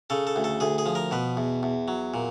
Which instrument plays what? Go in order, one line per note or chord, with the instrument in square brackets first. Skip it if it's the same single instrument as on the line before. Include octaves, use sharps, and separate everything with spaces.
[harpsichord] C#3 A4
A4
D2
A4
D2 G#4
G#4
F3
A#4
B2 B4
E2
E2
F#3
A#2